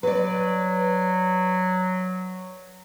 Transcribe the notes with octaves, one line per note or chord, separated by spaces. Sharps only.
F#3 B4 D5